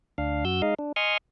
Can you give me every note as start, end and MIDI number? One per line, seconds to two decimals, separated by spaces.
0.18 0.45 38
0.18 0.45 62
0.18 0.45 77
0.45 0.62 42
0.45 0.62 66
0.45 0.62 88
0.45 0.62 91
0.62 0.74 56
0.62 0.74 63
0.62 0.74 75
0.62 0.74 77
0.79 0.92 62
0.96 1.17 75
0.96 1.17 80
0.96 1.17 84
0.96 1.17 85
0.96 1.17 87
0.96 1.17 89